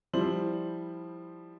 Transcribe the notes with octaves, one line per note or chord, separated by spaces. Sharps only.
F3 G3 E4 C5 F#7